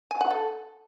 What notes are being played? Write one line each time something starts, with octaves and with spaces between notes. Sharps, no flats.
G#5
F#5
A4